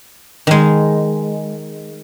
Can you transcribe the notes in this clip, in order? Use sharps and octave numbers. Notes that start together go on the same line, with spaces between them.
D#3 G#3